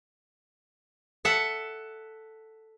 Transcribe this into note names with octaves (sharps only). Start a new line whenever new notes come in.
A4 E5 F#5